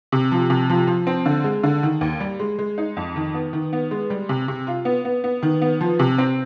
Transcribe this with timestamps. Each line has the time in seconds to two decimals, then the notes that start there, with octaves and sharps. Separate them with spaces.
0.12 C3
0.32 F3
0.50 C3
0.70 F3
0.87 F3
1.07 C4
1.26 D3
1.44 G#3
1.63 D3
1.83 D#3
2.01 D#2
2.20 G3
2.39 G#3
2.59 G#3
2.78 D#4
2.97 F2
3.16 D#3
3.34 B3
3.53 D#3
3.73 B3
3.91 G#3
4.10 G3
4.29 C3
4.48 C3
4.67 F4
4.85 B3
5.05 B3
5.24 B3
5.43 D#3
5.61 B3
5.81 F3
5.99 C3
6.18 C4